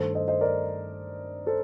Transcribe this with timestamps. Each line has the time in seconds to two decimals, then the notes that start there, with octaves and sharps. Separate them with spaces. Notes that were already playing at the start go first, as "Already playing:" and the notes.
Already playing: G2 D#3 A3 A4 C5
0.14 C5 D#5
0.28 C5 D#5
0.41 A#4 D5
1.46 A4 C5